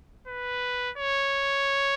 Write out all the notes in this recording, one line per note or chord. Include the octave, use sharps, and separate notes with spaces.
B4
C#5